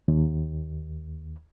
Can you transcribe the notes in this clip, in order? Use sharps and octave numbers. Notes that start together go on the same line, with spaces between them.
D#2